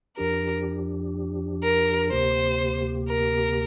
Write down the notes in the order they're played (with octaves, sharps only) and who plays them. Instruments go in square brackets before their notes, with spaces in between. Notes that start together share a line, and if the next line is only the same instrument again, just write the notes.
[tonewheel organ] F2 F3 D4 G4 [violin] A#4
[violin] A#4
[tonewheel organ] D2 C3 A#3 G4 [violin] C5
[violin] A#4